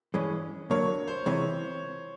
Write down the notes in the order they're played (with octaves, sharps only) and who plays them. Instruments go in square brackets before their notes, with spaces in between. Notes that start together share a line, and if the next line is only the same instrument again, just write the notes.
[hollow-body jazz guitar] G2 E3 G#3 C#4
[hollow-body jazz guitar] D2 D3 F#3 A#3 [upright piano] C#5
[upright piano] C5
[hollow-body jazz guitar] C3 E3 G#3 [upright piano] C#5